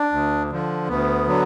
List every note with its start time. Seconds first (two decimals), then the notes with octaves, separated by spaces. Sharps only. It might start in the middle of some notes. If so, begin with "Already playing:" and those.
Already playing: D4
0.12 D2
0.50 D3 F3
0.89 D2 B3
1.27 D3 F#3